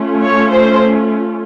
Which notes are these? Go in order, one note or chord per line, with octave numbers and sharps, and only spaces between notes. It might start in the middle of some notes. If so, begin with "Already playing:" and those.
Already playing: A3 C#4 F4
C#5
C5